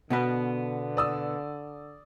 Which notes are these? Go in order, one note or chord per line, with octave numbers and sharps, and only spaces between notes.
B2 D3 B3 B4
D5 D#6 E6